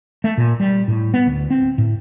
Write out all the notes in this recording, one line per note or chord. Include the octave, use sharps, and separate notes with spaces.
A3
A#2
G3
A2
B3
D2
C4
A2